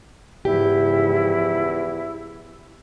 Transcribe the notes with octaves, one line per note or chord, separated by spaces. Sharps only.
E2 G#2 C#3 F3 E4 G4